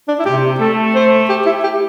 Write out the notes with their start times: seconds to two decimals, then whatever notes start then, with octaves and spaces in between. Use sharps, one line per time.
0.08 D4
0.19 E4
0.26 C3 G4
0.60 A3 A4
0.95 C5
1.29 G4
1.46 E4
1.63 G4